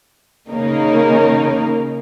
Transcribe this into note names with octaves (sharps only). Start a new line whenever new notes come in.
C#3 A#3 D#4 A#4